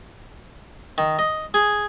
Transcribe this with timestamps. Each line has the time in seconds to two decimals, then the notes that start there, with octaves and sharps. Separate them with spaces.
0.98 D#3
1.19 D#5
1.54 G#4